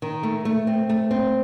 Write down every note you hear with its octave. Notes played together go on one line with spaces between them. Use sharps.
D#3
A3
A3
C4
A3
C4